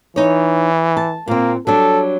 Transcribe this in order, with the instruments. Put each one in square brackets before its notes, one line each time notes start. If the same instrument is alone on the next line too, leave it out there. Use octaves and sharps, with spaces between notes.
[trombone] E3 [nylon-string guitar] D#4 C#5
[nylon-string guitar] A5
[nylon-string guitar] A#2 C4 [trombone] A#3
[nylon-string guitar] F#3 G3 D4 [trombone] A4